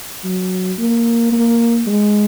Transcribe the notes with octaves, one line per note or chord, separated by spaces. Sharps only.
F#3
A#3
A#3
G#3